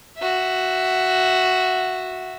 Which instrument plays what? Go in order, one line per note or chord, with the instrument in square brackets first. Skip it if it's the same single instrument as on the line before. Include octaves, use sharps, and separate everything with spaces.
[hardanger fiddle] F#4 E5